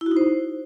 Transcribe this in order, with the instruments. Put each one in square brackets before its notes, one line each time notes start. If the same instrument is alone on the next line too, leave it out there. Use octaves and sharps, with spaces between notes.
[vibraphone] E4
F#4
D#4
C5